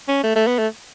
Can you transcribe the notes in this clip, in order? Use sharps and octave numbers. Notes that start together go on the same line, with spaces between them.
C#4
A3
A3
B3
A3